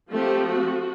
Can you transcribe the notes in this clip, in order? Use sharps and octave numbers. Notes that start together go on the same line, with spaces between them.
F3 A3 C4 G4
F#4